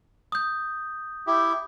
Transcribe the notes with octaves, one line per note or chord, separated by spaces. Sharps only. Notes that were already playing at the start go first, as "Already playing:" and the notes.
D#6 G6
E4 G4